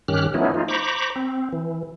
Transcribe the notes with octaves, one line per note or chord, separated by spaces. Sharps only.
G2 D#3 C#4 G4 F6 F#6
F3 A3 B3 C#4 D#4 E4
D#4 F4
C5 A#5 B5 C#6 D6
C4
E3